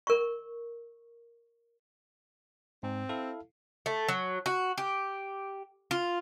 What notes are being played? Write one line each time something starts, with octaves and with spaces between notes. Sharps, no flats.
A#4 C#6
G#2 C4
E4 A4 F5
A3
F#3
F#4
G4
F4